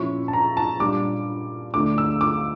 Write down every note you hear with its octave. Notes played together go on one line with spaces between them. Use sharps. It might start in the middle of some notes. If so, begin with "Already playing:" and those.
Already playing: A#2 F3 C#4 E4 C#6
A5
A#5
A5
A#2 G3 D4 D6
D2 D3 A3 D4 D6
E6
D6